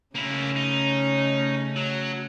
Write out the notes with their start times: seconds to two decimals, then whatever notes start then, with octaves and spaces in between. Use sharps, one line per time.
0.16 C#3 A3 A#3 C#4 E4
0.56 D#4
1.76 F#3